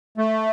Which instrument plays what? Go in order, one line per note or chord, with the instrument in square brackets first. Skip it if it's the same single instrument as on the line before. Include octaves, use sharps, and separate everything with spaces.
[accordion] A3